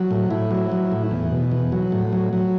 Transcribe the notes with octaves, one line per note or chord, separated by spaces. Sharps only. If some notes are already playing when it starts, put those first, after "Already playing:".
Already playing: F#3
A2
A2 E4
F#3
F#3
A2
E2
B2
E2
F#3
A2
F#3
F#3